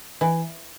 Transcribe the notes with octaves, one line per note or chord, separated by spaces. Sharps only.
E3